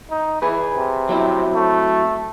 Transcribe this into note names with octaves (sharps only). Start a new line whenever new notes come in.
D#4
E3 G#4 B4
C3
F#3 C4 E4
A3